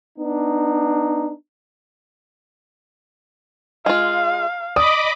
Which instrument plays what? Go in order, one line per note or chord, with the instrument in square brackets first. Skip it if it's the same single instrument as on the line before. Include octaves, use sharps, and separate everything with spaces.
[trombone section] B3 D4 D#4
[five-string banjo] G#3 F4 [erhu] F5
[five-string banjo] D5 [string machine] D#5 B5 D6 [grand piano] D#6